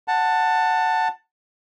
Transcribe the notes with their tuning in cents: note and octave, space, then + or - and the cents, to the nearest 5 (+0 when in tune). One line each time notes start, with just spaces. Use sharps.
F#5 -5 A5 +15